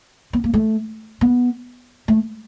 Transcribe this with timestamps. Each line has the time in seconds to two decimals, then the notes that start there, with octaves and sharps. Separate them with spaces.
0.33 B3
0.44 A#3
0.54 A3
1.21 B3
2.08 A3